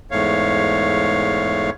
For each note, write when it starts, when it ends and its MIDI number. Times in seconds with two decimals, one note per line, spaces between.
0.11 1.70 40
0.11 1.70 44
0.11 1.70 57
0.11 1.70 73
0.11 1.70 77